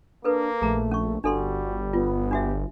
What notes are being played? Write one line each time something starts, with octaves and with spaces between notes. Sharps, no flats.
A#3 D4 A4 B4
A#1 A3 G#4 A#5
C#4 C#6
G1 G3 D4 F#4 A4 C6
B3 F4
D4 F#4 G4 E5